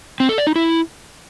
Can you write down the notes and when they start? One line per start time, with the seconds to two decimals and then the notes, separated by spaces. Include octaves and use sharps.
0.20 C4
0.29 A4
0.38 D5
0.47 D#4
0.56 E4